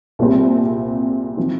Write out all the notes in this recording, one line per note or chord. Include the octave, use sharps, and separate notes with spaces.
C2 A#2 G3 C4
F3 C4 D#4